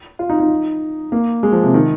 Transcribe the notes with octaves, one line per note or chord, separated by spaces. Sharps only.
F4
D#4
D#4
A#3
G#3
F3
C3
D#3